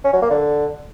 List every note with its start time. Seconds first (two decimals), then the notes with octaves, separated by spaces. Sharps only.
0.04 C#4
0.13 F#3
0.22 A#3
0.30 D3